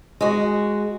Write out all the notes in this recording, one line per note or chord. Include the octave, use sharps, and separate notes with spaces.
G#3 F#4